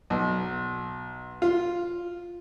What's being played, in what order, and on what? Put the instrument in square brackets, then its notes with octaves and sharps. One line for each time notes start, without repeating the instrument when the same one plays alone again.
[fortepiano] B1
F4